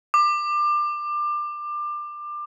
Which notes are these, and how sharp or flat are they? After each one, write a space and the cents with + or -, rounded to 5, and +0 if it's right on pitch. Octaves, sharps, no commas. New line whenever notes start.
D6 +25